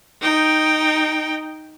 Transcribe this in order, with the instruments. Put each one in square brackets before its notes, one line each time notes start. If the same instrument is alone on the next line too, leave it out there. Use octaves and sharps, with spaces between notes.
[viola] D#4 G5